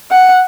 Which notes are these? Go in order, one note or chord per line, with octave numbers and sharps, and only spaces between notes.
F#5